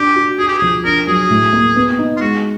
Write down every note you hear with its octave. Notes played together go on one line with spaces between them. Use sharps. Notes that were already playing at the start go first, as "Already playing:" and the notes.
Already playing: D4 G4
F#4
F#4 G#4
G4
F3 G#4
D4 A#4
F#3 G#4
A2
A#3
B3
D#4
F4
G#3 F#4